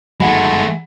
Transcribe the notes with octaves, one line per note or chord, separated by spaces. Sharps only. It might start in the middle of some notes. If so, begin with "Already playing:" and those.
G1 D#3 F#3 G#3 A3 F#5 B5